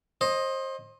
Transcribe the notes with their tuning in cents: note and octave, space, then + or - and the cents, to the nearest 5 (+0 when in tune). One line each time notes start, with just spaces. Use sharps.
C5 +30 D#5 +0